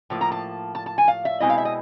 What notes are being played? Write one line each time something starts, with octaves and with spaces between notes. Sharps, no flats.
A2 F3 A#3
A#5
A5
A5
A5
G#5
F5
E5
B2 G#3 C4 E4 D#5
F5
E5
D#5